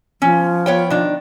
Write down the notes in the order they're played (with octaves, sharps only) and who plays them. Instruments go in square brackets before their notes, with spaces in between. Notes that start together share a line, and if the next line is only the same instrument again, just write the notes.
[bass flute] F3 [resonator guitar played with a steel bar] C#4
[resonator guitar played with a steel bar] B3 C#5 G5
D#3 D4